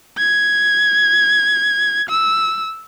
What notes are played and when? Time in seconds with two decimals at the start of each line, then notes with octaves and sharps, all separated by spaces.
0.17 G#6
2.09 E6